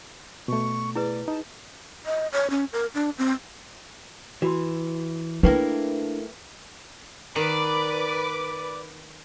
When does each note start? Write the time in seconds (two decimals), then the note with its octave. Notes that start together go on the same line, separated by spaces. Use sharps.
0.48 B2 A3 C#6
0.96 E4 G#4 B4 D5
1.28 D#4 A5
2.06 D#5
2.32 C#5
2.50 C#4
2.72 A#4
2.95 D4
3.18 C4
4.42 E3 F#4 C6
5.43 A3 A#3 D4 E4 B4 E5 G5
7.36 D#3 B4 D5 D6